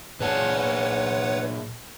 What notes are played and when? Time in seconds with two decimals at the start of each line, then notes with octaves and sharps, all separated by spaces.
0.20 A#2 G#4 B4 C#5 F#5 A5